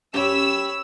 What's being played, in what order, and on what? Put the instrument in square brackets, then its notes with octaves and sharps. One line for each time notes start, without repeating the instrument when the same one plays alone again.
[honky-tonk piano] F#2 C#4 [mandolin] G4 G5 [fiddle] C#5 B5 [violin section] E6